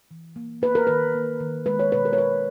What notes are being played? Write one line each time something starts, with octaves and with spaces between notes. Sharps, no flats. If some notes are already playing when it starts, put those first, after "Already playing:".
E3
A#3
A#3 B4
A#4
D#3 B4
A#3
D#3
G#3 B4
C#5
B2 B4
A#4
C#5
B2 B4